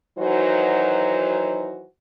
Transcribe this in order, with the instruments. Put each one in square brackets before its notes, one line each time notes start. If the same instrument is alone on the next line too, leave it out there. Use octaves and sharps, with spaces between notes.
[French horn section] D#3 E3 F#3 D#4 F#4 C5